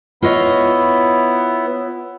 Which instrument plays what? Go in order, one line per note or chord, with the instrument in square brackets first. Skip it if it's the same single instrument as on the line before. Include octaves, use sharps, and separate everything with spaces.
[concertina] B3 E4 [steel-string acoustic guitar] F4 C#5 D#5